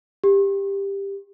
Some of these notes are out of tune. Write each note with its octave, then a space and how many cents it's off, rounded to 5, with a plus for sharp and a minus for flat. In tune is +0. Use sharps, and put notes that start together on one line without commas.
G4 +15